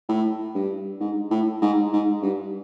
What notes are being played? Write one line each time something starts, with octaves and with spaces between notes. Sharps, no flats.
A2
G2
G#2
A2
G#2
G#2
G2